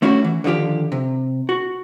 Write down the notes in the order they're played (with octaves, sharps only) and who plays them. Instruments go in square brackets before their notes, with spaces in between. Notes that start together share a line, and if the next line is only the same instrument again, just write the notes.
[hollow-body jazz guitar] A3 C#4 D4 E4 F#4 G4
E3
D3 D#3 F3 F4 G4
C3
F#4